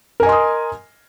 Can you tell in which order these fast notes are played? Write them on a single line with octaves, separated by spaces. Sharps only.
A#4 G#5 D#5 C6 D#6